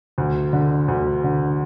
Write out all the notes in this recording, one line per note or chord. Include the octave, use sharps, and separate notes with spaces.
D2
D3
D2
D3